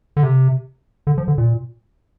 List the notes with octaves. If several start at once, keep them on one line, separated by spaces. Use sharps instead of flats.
D3
C3
D3
F3
D3
A#2